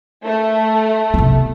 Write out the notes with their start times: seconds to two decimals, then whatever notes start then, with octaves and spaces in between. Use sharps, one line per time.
0.25 A3
1.14 C3 B3